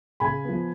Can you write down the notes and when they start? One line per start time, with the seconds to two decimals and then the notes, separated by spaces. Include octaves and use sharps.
0.20 C#3 G#5 B5
0.45 F3 B3